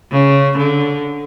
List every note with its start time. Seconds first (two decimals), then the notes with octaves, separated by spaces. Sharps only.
0.12 C#3
0.58 D3